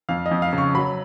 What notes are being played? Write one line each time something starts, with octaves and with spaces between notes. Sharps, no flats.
F2 F5
D#5
F2
F5
C#3
C#6
F#3 B5